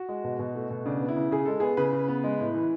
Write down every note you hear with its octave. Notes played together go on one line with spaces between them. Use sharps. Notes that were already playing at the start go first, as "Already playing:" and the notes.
Already playing: F#4
G#3
B2
B2
A3
B2
C#3 D4
B3
E4
C#3
C#3 G#4
G#3 A4
B3 G#4
C#3 B4
C#3
B3
G#3
A2
E3